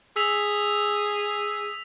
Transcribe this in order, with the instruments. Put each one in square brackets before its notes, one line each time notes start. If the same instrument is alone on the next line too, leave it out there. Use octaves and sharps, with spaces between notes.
[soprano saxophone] G#4 [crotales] E6 B6 F7